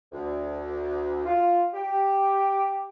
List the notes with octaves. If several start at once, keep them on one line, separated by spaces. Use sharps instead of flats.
D2
F4
G4